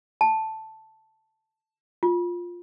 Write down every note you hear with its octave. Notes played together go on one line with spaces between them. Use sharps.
A5
F4